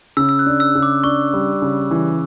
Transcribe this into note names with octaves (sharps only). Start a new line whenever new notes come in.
C#3 E6
E6
F#6
D4
E6
C#3
D6
D4 C#6
G3
C#3
E3